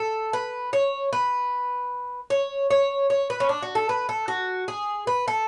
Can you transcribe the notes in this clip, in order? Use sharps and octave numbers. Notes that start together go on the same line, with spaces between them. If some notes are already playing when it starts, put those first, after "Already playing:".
Already playing: A4
B4
C#5
B4
C#5
C#5
C#5
B4
C#4
D4
F#4
A4
B4
A4
F#4
G#4
B4
A4